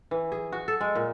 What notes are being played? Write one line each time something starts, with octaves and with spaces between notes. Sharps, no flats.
E3
G#4
F#4
A4
G#3
A#2